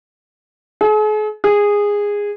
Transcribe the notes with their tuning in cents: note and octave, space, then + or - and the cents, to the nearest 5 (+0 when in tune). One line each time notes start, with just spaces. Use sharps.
G#4 +45
G#4 -15